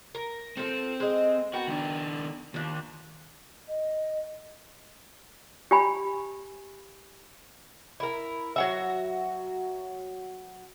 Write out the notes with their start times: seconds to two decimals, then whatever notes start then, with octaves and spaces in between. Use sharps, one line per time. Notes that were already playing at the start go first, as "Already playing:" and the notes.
0.15 A#4
0.57 F3 C4 A4
1.00 G#3 D#5
1.53 B3 F#4 A#4 G5
1.68 D#3 D4
2.54 D#2 F3 D4
3.67 D#5
5.71 G4 G#5 B5
8.00 E4 A#4
8.56 F#3 F#4 E5